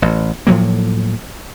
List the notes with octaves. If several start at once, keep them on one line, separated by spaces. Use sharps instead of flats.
A1
A2 F3 F#3 A#3